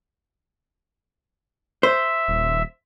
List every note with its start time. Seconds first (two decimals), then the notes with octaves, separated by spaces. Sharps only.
1.83 C5 E5
2.28 D#1